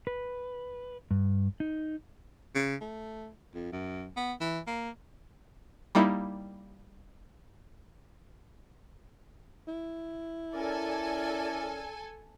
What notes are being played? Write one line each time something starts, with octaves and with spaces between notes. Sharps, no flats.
B4
G2
D#4
C#3
A3
F2
F#2
B3
E3
A#3
G3 A#3 D#4 E4
E4
C#4 A4 A#4 D5 G#5